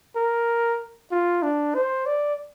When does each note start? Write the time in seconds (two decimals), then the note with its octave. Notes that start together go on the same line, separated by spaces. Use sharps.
0.16 A#4
1.11 F4
1.43 D4
1.75 C5
2.06 D5